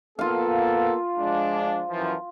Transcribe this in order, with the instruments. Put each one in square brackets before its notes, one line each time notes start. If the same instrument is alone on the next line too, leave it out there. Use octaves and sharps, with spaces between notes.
[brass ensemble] A#3 B3 A4 [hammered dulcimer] F4 F5
[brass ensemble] F3 G#3 D4
F#2 E3 F3